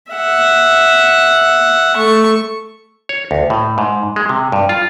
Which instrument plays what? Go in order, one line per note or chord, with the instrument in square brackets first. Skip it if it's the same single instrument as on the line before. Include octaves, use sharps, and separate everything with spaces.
[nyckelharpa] E5 F#5
A3 C#6
[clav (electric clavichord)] C#5
D2
A2
G#2
G#3
C3
G2
F4